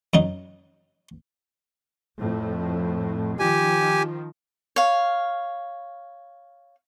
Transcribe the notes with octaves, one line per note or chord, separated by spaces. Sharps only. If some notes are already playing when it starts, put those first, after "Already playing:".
F#2 F#3 D#4
F2 A2
D#3 F3 G4 G#5
C#5 F5